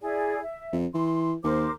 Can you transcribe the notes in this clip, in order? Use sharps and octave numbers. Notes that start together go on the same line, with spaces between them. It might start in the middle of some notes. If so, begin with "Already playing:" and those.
E4 G#4 D5
E5
F2
E3 C6
D#2 A#4 C5 D6